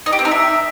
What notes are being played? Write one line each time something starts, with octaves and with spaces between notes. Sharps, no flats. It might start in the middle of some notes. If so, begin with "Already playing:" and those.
D#4
G4
C4
D#4
E5